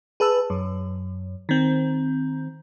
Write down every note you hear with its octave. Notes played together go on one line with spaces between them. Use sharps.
G#4 B4 A5 E6
F#2
D#3 C4